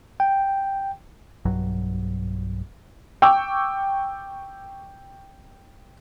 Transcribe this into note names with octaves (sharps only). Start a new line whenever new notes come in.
G5
B1 G2 F#3
G5 C#6 D6 E6